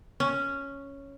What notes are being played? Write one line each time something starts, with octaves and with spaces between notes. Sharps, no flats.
C#4